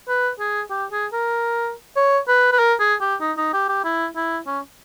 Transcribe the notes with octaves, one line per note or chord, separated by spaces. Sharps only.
B4
G#4
G4
G#4
A#4
C#5
B4
B4
A#4
G#4
G4
D#4
D#4
G4
G4
E4
E4
C#4